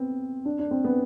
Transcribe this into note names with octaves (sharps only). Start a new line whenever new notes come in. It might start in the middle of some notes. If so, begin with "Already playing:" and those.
Already playing: B3 C4
D4
D4
C4
B3